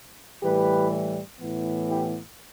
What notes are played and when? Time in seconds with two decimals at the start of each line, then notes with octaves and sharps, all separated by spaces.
0.43 A2 E3 G3 G4 B4
1.40 A2 E3 B3
1.88 E4 G4